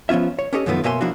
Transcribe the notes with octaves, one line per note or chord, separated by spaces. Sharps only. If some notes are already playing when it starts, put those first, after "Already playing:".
F3 B3 C#4 F4 E5
C#5
C#4 G4 A4 C#5 D#5
F#2 D#3 F3 A3 B3
B2 A#3 C#5 E5 G#5 C6
F3 A#3 D4 E4 F#4